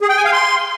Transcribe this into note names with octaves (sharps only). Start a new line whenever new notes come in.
G#4
G5
G#5
F5
C6